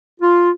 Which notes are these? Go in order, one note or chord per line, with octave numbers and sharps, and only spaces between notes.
F4